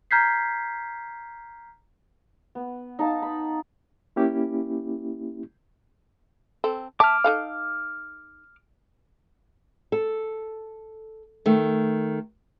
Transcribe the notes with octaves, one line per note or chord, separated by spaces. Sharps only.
A#5 F6 G6 G#6 B6 C7
B3
D#4 F5 A5
B5
A#3 C#4 E4 G4
C4 A4
E5 A5 D6 F6
D#4 A4 F5
A4
D#3 A3